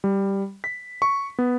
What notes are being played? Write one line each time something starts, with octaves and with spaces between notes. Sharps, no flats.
G3
B6
C#6
B3